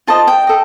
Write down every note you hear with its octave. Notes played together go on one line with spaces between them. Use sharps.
F4 C5 D#5 A5
G5
A4 D#5